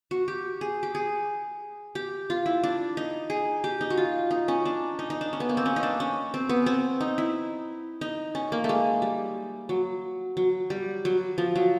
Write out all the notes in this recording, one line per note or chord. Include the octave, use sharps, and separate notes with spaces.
F#4
G4
G#4
G4
G#4
G4
F4
E4
D4
D#4
G#4
G4
D#4
F#4
F4
D#4
C#4
D4
D#4
D#4
D4
C#4
B3
A#3
C4
C#4
D#4
D4
C#4
C4
B3
C4
D#4
E4
D#4
C#4
A#3
A3
G#3
G3
F#3
F#3
G3
F#3
F3
F#3